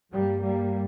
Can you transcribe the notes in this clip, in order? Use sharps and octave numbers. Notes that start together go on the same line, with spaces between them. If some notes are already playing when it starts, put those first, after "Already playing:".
G2 G3 A#3
G3 A#3